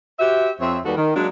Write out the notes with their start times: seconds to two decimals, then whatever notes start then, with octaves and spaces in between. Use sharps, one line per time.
0.19 F#4 G4 C5 E5
0.60 F2 C4 C#5 E5
0.85 D#2 G3 F#4 A4 B4
0.97 D#3
1.15 F#3 G#3 A#3 D4